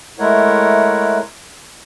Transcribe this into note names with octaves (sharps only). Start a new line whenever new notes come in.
G#3 A3 E4 A#4 C#5 F#5